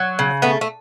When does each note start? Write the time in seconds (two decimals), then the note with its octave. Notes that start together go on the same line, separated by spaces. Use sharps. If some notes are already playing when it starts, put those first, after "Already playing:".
Already playing: F#3
0.19 C#3
0.42 A3 B3
0.61 A3